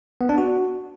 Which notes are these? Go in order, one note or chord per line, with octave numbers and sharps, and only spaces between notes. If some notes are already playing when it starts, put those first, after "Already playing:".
B3
D4
F#4